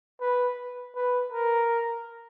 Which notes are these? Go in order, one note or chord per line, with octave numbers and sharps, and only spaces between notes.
B4
B4
A#4